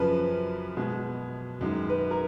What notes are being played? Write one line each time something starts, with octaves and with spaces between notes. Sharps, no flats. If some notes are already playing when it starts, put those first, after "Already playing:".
Already playing: F#2 C#3 F3 B4
B2 G#3
F#2 D#3 G#3
B4
A#4